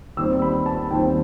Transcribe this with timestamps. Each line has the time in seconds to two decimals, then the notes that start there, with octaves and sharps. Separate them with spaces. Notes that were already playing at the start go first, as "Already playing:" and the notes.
0.17 D#2 D#3 G3 C4 E6
0.42 B5
0.66 A5
0.91 D#2 D#3 G3 C4 G5